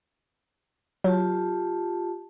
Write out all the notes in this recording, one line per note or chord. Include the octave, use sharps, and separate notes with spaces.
F#3 F4 G4 A5